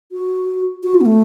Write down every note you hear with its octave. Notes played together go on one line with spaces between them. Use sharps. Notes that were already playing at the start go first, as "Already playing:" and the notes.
F#4
F#4
F4
B3
A3